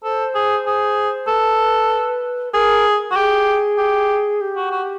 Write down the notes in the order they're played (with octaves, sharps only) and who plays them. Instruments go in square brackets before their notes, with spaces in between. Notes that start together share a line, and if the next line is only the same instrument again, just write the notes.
[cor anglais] A4 [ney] C5
[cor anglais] G#4
G#4
[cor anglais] A4 [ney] B4
[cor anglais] G#4 [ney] A#4
[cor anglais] F#4
[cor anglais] G4 [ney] G#4
[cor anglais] G4
[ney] G4
[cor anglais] F#4
F#4